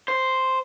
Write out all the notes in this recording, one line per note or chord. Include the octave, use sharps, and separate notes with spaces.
C5